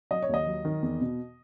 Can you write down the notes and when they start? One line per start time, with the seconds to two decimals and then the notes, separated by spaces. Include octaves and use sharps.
0.11 F#3 D#5
0.22 C#5
0.29 D#2 D#5
0.47 F#3
0.65 D#3
0.82 E2
1.01 B2